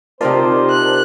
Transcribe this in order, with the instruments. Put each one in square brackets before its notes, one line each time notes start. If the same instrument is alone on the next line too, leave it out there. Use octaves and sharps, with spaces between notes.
[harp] C3 D#4 F4 [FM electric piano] A#4 D5 A5 [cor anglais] C5
[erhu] F#6